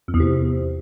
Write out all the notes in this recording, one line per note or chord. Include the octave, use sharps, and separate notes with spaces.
F2
E2
C3